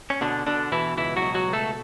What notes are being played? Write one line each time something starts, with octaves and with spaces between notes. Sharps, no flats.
C#4
B2 D3 D4
B2 D3 D4
B2 E3 E4
C#2 E3 E4
F#3 F#4
B2
F#3 F#4
C#2
A3 A4